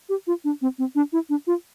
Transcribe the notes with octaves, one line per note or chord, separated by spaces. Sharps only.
G4
F4
D4
C4
C4
D4
E4
D4
F4